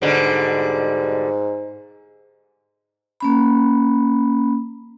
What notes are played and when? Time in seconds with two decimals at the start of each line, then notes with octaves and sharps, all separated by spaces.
0.02 G#2 B2 D3 G3
3.20 A#3 C#4 B5